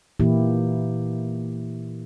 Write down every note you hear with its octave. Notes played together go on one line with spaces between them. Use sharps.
A#2 E3 A#3 E4 G4